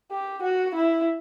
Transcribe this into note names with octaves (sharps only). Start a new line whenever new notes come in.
G4
F#4
E4